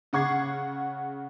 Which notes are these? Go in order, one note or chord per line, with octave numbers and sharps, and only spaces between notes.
C#3 F#5 C#6 G#6 C7